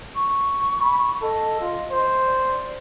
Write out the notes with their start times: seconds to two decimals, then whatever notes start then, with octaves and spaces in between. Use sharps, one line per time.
0.14 C#6
0.81 B5
1.22 A4 D#5
1.61 F4
1.91 C5
2.25 D5